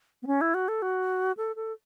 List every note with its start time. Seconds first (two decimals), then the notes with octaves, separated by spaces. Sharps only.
0.22 B3
0.27 C#4
0.41 E4
0.54 F#4
0.68 A4
0.82 F#4
1.37 A4
1.56 A4